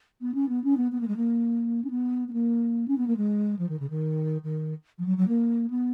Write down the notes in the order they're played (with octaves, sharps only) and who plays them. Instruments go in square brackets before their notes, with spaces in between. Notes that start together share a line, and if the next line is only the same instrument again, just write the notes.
[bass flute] B3
C#4
B3
C#4
B3
B3
A#3
G#3
A#3
C#4
B3
B3
A#3
C#4
B3
A#3
G#3
F3
D#3
C#3
D#3
D#3
F3
F#3
F#3
A#3
B3